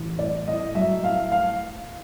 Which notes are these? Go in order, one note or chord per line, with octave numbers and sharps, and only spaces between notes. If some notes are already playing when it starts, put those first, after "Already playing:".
Already playing: A1
A2 D5
A2 D#5
F#3 E5
A2 F5
F5